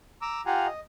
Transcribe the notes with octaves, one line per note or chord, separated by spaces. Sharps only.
A#5 D6 E6
F4 G4 F5 F#5 G#5 A#5
D#5